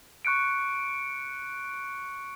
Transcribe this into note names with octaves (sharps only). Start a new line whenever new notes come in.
C#6 F#6 C#7 D7